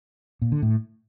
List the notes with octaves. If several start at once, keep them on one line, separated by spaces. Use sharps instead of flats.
A#2
D3
A2